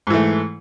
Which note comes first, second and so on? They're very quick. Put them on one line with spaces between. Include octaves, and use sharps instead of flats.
G#2 E3 A3